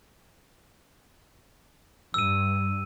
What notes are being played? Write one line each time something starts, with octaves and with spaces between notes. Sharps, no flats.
G2 E6 D#7